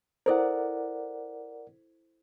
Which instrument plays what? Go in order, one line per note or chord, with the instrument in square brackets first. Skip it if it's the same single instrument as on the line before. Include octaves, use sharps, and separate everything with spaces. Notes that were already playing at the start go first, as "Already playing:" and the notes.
[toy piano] E4 A4 C5 [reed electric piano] A#4 D5 F#5